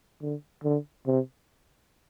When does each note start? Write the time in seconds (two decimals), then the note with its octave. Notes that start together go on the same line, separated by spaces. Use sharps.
0.22 D3
0.64 D3
1.06 C3